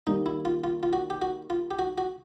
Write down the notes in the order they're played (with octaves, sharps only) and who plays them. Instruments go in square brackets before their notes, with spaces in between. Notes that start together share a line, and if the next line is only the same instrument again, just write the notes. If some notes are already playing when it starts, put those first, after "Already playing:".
[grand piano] D#3 G3 A#3 [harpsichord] D#4
[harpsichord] E4
F4
F4
F4
F#4
G4
F#4
F4
G4
F#4
F#4